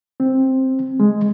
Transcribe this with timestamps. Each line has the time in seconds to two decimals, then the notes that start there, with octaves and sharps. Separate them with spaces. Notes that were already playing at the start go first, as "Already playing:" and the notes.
0.20 C4
1.00 G#3